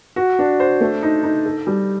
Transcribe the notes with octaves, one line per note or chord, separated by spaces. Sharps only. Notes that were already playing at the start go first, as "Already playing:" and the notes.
F#4
D4
C5
A3
D#4
D#4
A4
G3